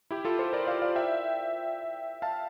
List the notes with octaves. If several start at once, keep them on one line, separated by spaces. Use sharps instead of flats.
E4 G4
F4 A4
A4 C5
A#4 D5
D5 F5
D5 F5
E5 G5
F5 A5